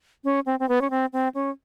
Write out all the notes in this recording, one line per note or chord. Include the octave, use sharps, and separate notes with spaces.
C#4
C4
C4
B3
C#4
C4
C4
C#4